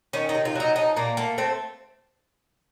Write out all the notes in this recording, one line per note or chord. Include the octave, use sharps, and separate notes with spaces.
D#3 C#4
D#4
C3
F4
F#3 D#4
F3 D#4
A#2 A#3
A3 A#3
A3 C4